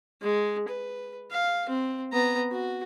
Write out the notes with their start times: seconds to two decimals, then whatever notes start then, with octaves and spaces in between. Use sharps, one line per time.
0.22 G#3
0.68 B4
1.31 F5
1.69 C4
2.13 B3 A#5
2.52 F#4